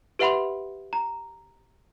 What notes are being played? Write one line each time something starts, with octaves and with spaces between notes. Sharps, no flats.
G4 B4 E5 F#5 B5 C6
A#5